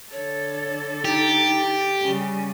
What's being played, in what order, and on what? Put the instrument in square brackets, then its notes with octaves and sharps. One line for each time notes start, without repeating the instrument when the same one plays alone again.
[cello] D3 A4 [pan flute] C#5
[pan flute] D#4 [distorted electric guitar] G4
[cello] C#3 G3 [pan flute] G#5